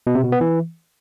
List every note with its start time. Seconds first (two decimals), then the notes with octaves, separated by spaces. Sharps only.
0.07 B2
0.15 C3
0.24 B2
0.32 B3
0.41 E3